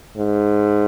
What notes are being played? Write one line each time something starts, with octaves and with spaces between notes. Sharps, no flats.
G#2